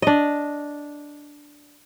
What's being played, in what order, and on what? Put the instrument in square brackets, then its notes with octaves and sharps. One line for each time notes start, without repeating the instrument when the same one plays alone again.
[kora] D4 D#5